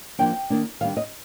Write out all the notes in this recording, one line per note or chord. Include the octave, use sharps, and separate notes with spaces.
F3 A#3 D4 G5
D#3 A#3 D4
D#3 G3 D4 F5
D#5